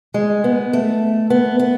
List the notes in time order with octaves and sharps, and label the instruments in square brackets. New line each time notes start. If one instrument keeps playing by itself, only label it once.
[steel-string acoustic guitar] G#3
B3
A3
B3
B3